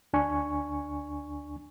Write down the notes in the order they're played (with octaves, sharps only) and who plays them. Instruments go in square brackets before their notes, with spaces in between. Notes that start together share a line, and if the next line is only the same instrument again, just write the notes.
[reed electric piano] D2 D4 G#5 C#6